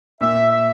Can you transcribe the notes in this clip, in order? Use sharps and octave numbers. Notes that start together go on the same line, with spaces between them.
A#2 E5
E5